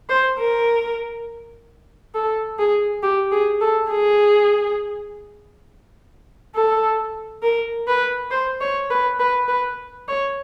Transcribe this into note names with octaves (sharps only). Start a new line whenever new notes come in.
C5
A#4
A4
G#4
G4
G#4
A4
G#4
A4
A#4
B4
C5
C#5
B4
B4
B4
C#5